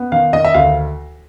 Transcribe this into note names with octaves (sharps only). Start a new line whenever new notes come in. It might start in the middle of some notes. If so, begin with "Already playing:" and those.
Already playing: B3
D#3 F5
D#3 D#5
E5
D2 F5